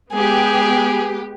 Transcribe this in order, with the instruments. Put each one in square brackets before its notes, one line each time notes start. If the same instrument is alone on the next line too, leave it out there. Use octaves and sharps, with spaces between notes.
[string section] G#3 B3 G4 [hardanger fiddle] G#4